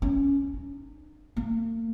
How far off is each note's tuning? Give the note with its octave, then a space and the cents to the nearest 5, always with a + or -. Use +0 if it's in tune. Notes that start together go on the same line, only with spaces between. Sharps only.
C#4 +10
D#4 -35
A#3 -45